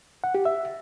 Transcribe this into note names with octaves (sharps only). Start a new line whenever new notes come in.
F#5
G4
E5